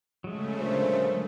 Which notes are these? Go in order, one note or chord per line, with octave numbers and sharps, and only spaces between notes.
C#3 F#3 G#3 A3
D2 A#2 C5